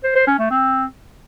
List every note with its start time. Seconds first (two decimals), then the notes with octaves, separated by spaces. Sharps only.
0.04 C5
0.16 C5
0.27 C#4
0.39 A3
0.50 C4